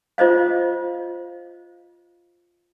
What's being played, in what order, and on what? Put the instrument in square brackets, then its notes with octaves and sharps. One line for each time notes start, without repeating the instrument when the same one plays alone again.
[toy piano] F4 C5 D#5 F5